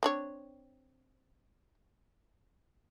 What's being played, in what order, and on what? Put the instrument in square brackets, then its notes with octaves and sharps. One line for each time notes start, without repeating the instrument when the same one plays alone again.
[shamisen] C4 D4 C#5